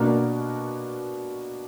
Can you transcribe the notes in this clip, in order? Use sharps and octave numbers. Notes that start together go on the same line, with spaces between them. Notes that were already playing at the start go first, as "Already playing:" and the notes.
Already playing: B2 A#3 D4 F#4 A#4